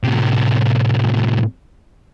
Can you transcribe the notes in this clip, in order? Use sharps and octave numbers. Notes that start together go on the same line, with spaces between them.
A2 C3